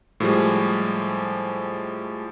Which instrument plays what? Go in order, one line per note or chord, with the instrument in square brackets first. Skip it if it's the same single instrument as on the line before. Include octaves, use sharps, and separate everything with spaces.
[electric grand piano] A2 F3 G3 G#3